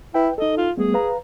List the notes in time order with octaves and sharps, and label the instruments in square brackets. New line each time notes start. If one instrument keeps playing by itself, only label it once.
[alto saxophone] E4 [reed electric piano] B4 G5
[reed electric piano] D#4 A4 [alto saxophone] D#5
[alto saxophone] F4
[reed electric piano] G3 A3 B3 [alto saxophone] G#4
[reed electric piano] B4 F5 A#5